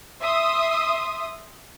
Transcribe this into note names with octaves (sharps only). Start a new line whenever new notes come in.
E5 C6 D#6